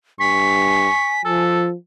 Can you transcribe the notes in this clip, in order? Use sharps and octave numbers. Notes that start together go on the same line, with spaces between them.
G2 G#5 C#6 B6
F3 A4